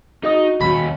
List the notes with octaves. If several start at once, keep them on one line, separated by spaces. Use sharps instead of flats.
D#4 F#4 G#4 D#5 D#6
D#2 C#4 B5